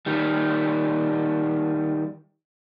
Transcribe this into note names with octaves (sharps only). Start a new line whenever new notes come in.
D#3 G3